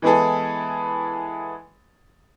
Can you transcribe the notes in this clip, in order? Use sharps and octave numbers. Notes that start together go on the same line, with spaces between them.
E3 G#3 B3 E4 G#4 A4